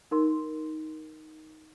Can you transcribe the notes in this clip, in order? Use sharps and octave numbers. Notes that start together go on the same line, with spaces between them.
D#4 A#4 C6